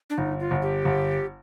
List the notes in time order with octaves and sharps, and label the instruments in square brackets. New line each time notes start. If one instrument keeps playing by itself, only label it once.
[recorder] D4
[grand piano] G1 [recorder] D#4
[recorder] F4
[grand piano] G1
[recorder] G4
[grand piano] G1